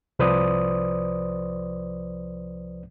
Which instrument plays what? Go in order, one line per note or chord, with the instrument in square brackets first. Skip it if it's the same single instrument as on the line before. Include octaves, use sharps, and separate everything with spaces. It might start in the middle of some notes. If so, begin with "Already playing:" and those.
[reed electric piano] C2 F3 B4 C5 D5 D#6